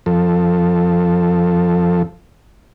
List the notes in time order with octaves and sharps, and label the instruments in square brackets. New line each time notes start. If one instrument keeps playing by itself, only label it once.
[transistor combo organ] F2 F3 A4